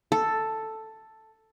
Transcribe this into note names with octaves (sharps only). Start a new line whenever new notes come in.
A4